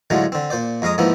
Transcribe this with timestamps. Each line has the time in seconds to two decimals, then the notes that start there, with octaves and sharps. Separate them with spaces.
0.10 A2 D3 F#3 G#3 F4
0.32 D3 C4
0.50 A#2 C5 D5
0.82 F2 G#3 F5 A#5 D#6
0.98 G#2 F3 A#3 B3 E4